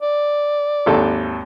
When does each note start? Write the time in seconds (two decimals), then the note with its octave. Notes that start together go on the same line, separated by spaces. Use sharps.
0.01 D5
0.86 G#1 D#2 A4